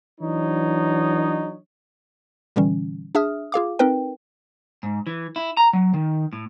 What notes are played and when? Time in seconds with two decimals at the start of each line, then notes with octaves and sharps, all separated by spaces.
0.20 E3 F#3 D4 D#4 C#5 D#5
2.56 A#2 D3 E3 G3 C#4
3.15 D4 G#4 E5 D#6 F6
3.52 F4 G#4 F5 D6
3.79 C4 D#4 A#4 B4 G5
4.83 G#2
5.07 E3
5.36 E4
5.57 A#5
5.73 F#3
5.94 D#3
6.33 A2